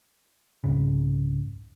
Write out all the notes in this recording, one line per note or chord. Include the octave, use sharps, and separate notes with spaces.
C2 F2 G#2 C#3